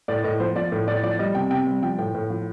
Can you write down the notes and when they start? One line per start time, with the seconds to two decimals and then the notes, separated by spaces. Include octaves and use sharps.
0.08 A2 D5
0.24 A2 D#5
0.40 F3 C5
0.56 F3 D5
0.72 A2
0.88 A2 D5
1.03 F3 D5
1.19 G3 D#5
1.35 C3 G5
1.51 C3 G5
1.67 G3
1.82 F3 G5
1.98 A2 G5
2.15 A2
2.30 F3